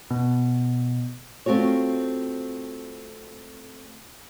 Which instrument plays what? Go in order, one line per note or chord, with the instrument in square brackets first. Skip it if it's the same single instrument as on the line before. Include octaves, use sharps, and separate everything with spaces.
[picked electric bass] B2
[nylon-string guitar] A3 C4 F4 F#4 C#5